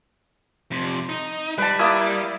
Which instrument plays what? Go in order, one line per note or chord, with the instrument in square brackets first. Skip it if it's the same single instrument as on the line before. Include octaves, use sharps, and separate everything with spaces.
[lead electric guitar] F2 C3
D#4
[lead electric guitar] G3 [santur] B4 A5
[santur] A#3 E4 D#6